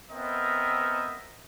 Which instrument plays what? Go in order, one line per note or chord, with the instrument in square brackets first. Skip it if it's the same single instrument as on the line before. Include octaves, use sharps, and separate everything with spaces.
[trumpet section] B3 C4 A#4 D#5 E5